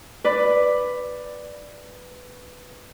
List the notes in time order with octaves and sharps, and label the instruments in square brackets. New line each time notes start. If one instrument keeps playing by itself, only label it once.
[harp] B4 D5